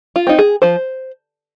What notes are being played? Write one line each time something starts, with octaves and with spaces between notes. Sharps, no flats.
F4
C4 D#4
G#4
F3 C5